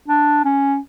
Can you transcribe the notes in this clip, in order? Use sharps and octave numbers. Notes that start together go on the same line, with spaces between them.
D4
C#4